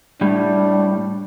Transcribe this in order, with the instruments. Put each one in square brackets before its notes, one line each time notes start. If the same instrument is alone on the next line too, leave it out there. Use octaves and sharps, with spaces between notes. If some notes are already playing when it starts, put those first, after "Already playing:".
[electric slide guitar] A2 G3 [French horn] D4